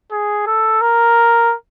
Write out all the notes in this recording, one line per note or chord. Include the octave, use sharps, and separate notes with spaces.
G#4
A4
A#4